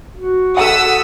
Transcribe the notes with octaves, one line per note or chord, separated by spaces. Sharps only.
F#4
A4 F#5 D#6 E6 B6